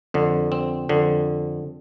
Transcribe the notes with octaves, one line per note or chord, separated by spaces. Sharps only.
F2 D3
C4
F2 D3